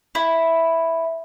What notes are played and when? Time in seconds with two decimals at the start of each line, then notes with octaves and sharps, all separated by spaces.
0.15 E4